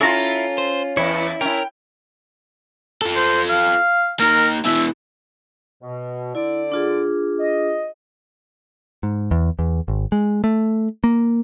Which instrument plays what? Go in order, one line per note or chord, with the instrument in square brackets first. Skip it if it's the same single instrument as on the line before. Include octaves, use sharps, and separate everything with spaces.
[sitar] C#4 F4 [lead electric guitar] E4 [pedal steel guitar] A4 A#5
[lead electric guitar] C5
[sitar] E2 [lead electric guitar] E4 [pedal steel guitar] B4 C#5
[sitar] C#4 E4 [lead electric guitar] A#4 [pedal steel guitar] G5
[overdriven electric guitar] F4 A4
[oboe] C5
F5
[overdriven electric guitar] A#3 D#4 [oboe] A#4
[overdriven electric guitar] B2 E3 [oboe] E5
[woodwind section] B2
[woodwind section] D3 D5 [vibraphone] E4
[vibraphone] D4 F4 G#4
[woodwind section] D#5
[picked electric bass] G#2
E2
E2
G#1
G#3
A3
A#3